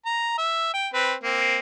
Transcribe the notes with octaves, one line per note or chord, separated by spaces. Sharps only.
A#5
E5
G5
C4 B4
A#3 C4